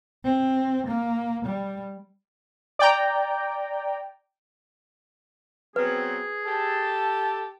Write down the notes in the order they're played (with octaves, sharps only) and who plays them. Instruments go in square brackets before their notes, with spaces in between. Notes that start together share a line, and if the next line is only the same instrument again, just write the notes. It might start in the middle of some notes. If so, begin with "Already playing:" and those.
[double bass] C4
A#3
G3
[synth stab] D5 G5 A#5
[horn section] F#3 B3 C4 [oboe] G#4 [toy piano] B4
[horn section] G4 A4 [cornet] A5